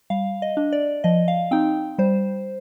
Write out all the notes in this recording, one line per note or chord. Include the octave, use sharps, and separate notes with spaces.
G3 F5
D#5
D4
D5
F3 D#5
F5
C4 D#4 G5
G3 C5